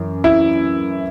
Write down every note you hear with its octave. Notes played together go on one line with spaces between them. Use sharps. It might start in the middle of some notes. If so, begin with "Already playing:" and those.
Already playing: F#2 E3
E4